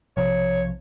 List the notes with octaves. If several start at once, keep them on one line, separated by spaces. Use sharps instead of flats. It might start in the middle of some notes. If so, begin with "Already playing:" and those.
B1 C3 F3 C#5